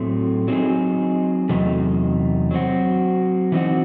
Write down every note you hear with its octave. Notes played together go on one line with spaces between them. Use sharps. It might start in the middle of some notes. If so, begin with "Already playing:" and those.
Already playing: A2 F#3 A3 C4
F#3 C4 D#4 G#4
E2 C3 F#3 A3 D#4
F#3 C4 F#4
E3 C4 D#4 F#4